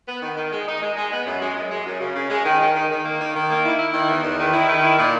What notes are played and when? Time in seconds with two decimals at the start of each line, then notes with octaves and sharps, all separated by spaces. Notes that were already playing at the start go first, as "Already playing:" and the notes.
0.08 B3
0.22 D#3
0.37 D#3
0.52 G#3
0.68 D#4
0.83 G#3
0.97 G#3
1.12 B3
1.27 F#2
1.41 G#3
1.56 F#2
1.71 G#3
1.86 F#2
2.01 C#3
2.15 C#3
2.30 G#3
2.45 D#3
2.60 D#3
2.76 D#3
2.90 D#3
3.05 A#3
3.20 D#3
3.35 D#3
3.50 A#3
3.65 E4
3.79 E4
3.94 D#3
4.09 E2
4.23 E2
4.39 D#3
4.53 E4
4.69 D#3
4.83 E4
4.98 A#2